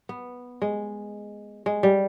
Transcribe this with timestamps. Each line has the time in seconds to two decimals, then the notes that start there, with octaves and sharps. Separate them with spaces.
0.09 B3
0.62 G#3
1.66 G#3
1.83 G3